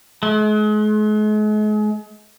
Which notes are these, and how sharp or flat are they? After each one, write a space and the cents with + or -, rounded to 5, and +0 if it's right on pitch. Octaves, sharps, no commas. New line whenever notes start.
G#3 +40